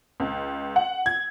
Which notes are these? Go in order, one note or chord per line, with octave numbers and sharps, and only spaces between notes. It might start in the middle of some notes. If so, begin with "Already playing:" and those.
C#2
F#5
G#6